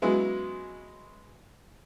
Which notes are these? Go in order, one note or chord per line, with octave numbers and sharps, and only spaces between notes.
C#3 F#3 G#3 B3 E4